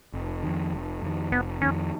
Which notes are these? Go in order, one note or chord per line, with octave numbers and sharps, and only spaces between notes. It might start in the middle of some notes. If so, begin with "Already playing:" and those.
F1
F2 D#3
F1
F2 D#3
F1 B3
F2 D#3 C#4